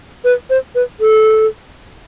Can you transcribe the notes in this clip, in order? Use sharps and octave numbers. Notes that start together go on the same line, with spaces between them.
B4
C5
B4
A4